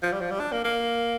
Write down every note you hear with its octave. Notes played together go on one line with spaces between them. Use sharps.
F3
G3
F3
G3
D4
A#3
A#3